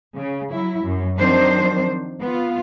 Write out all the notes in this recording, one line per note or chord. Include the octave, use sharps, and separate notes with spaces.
C#3
F#3 E4
F#2
D#3 F3 F#3 C4 D4 C5
B3 F4